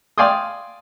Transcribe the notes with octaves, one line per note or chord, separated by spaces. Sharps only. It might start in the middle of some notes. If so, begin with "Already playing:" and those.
D5 F5 G5 G#5 C6 D#6